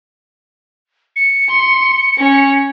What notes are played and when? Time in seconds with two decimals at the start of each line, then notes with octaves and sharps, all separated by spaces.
1.16 C#7
1.50 C6
2.18 C#4 C#5